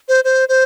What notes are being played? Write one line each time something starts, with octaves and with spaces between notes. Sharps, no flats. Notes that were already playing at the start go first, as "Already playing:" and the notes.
C5
C5
C5